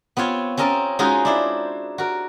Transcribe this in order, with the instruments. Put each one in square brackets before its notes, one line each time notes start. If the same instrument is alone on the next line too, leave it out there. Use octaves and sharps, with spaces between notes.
[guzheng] B3 C4 F4 C#5
C4 C#4 A#4 D#5 A5
G#3 C#4 D#4 F4 F#4 G#4
D4 E4 C5
F#4 A#4